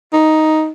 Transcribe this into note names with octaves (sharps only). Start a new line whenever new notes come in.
D#4